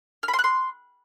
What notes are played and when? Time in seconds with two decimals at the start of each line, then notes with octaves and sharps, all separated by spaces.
0.23 F6
0.28 B5
0.33 C6
0.39 F#6
0.44 C6